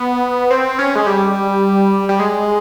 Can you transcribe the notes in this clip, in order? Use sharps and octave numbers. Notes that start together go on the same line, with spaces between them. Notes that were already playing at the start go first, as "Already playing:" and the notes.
Already playing: B3
C4
C#4
G#3
G3
G3
G#3